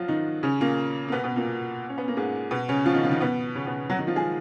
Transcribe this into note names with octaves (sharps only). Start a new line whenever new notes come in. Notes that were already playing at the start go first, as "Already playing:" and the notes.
Already playing: F3 F#3 F4 F#4
D#3 D#4
C#3 C#4
A#2 A#3
A#3
B2 B3
B2 B3
A#2 A#3
C#4
B3
A#3
G#2 G#3
B2 B3
C#3 C#4
F3 F4
D#3 D#4
F3 F4
D#3 D#4
B2 B3
C#3 C#4
B2 B3
F#3 F#4
D#3 D#4
F3 F4
G#3 G#4